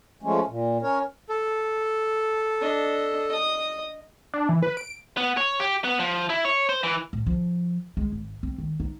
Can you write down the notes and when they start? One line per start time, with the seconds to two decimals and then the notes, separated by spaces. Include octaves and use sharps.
0.23 F3 G#3 A3 C#4
0.47 A#2
0.82 C#4 A#4 C#5
1.29 A4
2.60 D4 D#5
3.30 D#5 D#6
4.34 D4
4.49 E3
4.62 B4
4.77 D7
5.17 B3
5.37 C#5
5.60 G4
5.84 B3
6.00 F3
6.30 E4
6.45 C#5
6.69 C5
6.83 E3
7.13 A2
7.27 F3
7.97 G#3
8.12 G#1
8.43 C4
8.58 D#3
8.80 D#4